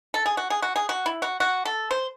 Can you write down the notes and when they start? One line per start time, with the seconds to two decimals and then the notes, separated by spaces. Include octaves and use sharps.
0.14 A4
0.26 G#4
0.37 F#4
0.50 G#4
0.62 F#4
0.76 G#4
0.89 F#4
1.06 E4
1.22 F#4
1.40 F#4
1.65 A4
1.91 C5